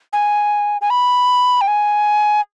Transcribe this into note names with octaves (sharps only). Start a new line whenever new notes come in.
G#5
G#5
B5
G5
G#5